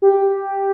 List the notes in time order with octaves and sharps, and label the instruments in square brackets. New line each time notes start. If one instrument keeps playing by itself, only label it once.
[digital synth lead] G4